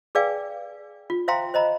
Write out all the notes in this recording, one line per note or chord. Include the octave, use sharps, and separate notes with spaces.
G#4 B4 D5 F5 G5 G#5
F4
C5 E5 F5 G5 A#5 C6
C5 D#5 A#5 B5